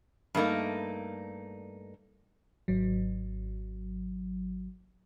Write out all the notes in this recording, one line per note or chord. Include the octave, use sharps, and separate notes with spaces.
G2 A3 A#3 D#4
G#1 F#3